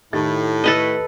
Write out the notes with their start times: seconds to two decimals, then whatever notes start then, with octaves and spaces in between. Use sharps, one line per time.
0.13 A2 D#3 G4 A6
0.64 A4 B4 D#5